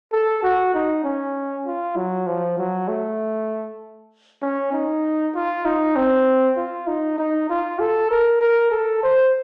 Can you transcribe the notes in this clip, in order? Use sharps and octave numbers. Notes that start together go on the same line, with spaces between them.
A4
F#4
D#4
C#4
F4
F#3
F3
F#3
A3
C#4
D#4
F4
D#4
C4
F4
D#4
D#4
F4
A4
A#4
A#4
A4
C5